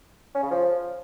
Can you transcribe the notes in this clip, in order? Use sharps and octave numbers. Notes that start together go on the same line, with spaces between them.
C#4
C#3
F3